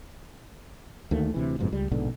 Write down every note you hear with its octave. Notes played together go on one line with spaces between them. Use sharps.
D2 D#3 A3 A#3
D2 C3 E3
F#1 F2 G#2 B2
C#2 G3
A#1 G#2 B2 D3